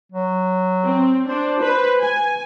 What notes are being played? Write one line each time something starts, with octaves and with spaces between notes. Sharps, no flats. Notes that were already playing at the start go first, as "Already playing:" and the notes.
F#3
C4
D4 C5
B4
G#5